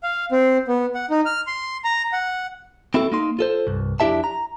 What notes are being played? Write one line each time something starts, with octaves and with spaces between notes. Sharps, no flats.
F5
C4
B3
F#5
D#4
F6
C6
A#5
F#5
C4 E4 F#4 A4
A#3 D#4 C6
F4 A4 C5
C2 G2
F2 D4 E4 G4 E5 A5
A#5